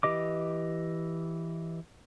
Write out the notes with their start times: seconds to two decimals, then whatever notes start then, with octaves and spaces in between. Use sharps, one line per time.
0.03 E3 G4 D#5 D6